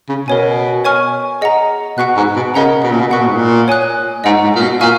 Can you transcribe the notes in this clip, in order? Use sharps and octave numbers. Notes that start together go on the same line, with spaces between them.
C#3
B2 A#4 C#5 G#5
C#5 G#5 C#6 F6
G#4 D#5 F#5 A#5
B2 F#5 C#6 F#6
G#2
B2
C#3 A#4 D#5 F#5 A#5
B2
A#2
B2
B2 F#5 C#6 F#6
A#2
G#2
A#2
C#5 G#5 D#6 F#6
G#2 D#5 F#5 A#5 C#6
G#2
A#2
B2
A#2 F5 G#5 C#6 F6